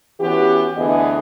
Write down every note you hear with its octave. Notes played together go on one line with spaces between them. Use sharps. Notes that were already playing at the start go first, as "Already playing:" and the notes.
E3 B3 C#4 F#4 G4
D2 E3 B3 G#4 D#5